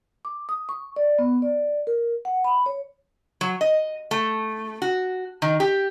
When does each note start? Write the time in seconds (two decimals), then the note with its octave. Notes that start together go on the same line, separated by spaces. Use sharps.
0.25 D6
0.49 D#6
0.69 C#6
0.96 D5
1.19 B3
1.42 D5
1.87 A#4
2.25 F#5
2.44 B5
2.66 C#5
3.41 F#3
3.61 D#5
4.11 A3
4.82 F#4
5.42 D#3
5.60 G4